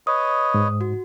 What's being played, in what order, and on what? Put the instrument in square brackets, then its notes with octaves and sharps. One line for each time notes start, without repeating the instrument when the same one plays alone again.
[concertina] B4 C#5 D#5 [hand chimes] D#6
[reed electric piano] G#2
[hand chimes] F#4